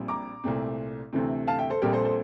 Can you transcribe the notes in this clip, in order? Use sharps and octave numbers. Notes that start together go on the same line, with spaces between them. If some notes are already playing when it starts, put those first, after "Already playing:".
Already playing: A#1 A#2 G3 C4
A#5 D6
C2 A#2 A3 C4
D2 C3 E3 A3 C4
F5 A5
E5 G5
A4 C5
A#1 A#2 G3 C4 G4 A#4
A4 C5
A4 C5